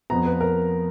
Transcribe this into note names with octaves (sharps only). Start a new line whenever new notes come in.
F2 F3 B3 A#5
B4
A#4